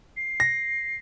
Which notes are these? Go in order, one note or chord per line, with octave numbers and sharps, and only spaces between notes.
C7
A#6